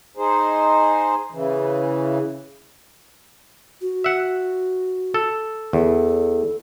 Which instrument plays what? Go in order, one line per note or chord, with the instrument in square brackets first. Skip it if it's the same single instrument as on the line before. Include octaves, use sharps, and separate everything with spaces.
[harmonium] D#4 G#4 C5
C#3 E3
[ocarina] F#4
[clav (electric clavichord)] E5 F#5
A4
[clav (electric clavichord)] E2 [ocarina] A4